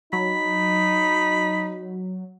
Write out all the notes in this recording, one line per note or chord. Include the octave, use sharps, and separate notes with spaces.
F#3 D#4 B5